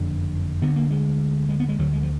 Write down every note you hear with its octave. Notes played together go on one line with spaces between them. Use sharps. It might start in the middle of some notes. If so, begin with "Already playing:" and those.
Already playing: F#1 F2 D3 D4
D2 D3 B3
A#3
G#3
G#3
B3
G#3
D2 D3 F#3
G#3
F3